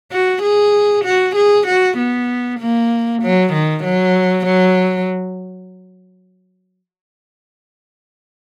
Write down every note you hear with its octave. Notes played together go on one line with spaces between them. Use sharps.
F#4
G#4
F#4
G#4
F#4
B3
A#3
F#3
D#3
F#3
F#3